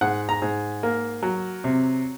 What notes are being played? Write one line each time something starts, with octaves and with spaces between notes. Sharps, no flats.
G#2 F#5
A#5
G#2
A#3
F#3
C3